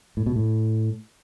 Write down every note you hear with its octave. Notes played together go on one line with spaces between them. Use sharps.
A2
B2
A2